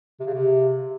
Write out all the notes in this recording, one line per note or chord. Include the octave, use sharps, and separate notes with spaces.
C3
C#3
C3